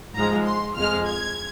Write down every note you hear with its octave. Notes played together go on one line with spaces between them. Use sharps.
G#2 F3 G#3 A#5
C6
F2 F3 G#3 F6
G#6